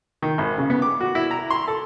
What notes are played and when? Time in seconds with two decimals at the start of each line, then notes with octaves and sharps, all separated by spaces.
0.22 D#3
0.38 G#1
0.58 C#3
0.70 B3
0.82 D6
1.01 F#4
1.15 E4
1.31 A#5
1.50 C6
1.68 A4